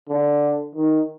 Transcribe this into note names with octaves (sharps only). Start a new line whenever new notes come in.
D3
D#3